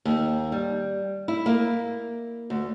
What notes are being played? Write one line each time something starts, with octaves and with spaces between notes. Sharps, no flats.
D#2
G3
E4
A#3
D2